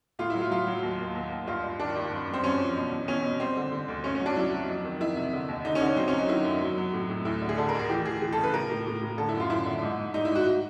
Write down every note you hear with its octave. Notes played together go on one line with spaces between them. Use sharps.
A2 F4
E4
F#3
F4
F#3 F4
F#3
D#2
D#2
D#2
D#2
G2 F4
G2
D#3 D4
G2
F#2
F#2
C4
F#2 C#4
F3
B2
E2
E2 C#4
B2
G3 C4
D3
D3
D2
G2 C#4
C#4
F#3
D4
F#3 E4
F#3
F2
D#3
F2 E4
C3
D3
D#2
D3 D#4
C#4
D3
C#4
F#3 C4
C#4
F#3 D#4
D#3 E4
F#2
F#3
F#3
A2
A2
D2 E4
D3
G#4
D3 A4
A#4
D2
G#4
E3 G4
E3 G#4
E3 G#4
A4
C#3
B4
A2 A#4
A2
A2
A2
D3 A4
E4
F#2
F4
F#2 E4
D3
G#2
G#2
G3 D#4
E4
G#2
F#4